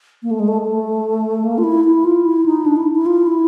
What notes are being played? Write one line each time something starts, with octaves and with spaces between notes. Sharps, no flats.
A#3
A3
G#3
A3
A3
A#3
F4
E4
E4
F4
E4
D#4
D4
E4
E4
F4
E4